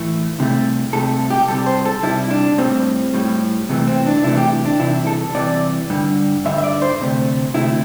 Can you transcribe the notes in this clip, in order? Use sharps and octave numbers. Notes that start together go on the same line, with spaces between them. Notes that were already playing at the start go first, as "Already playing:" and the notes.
Already playing: A2 E3 A3
C2 C3 A3
C2 C3 A3 A4
G4
C2 C3 G3 A4
C5
A4
C2 C3 G3 E4
D4
A2 G3 C4
A2 G3
C2 C3 E3 A3
C4
D4
C2 C3 E3 A3 E4
G4
D4
C2 C3 E3 E4
A4
C2 C3 E3 D5
G2 D3 G3
G2 D3 G3 E5
E5
D5
C5
D2 C3 A3
D2 C3 A3 E4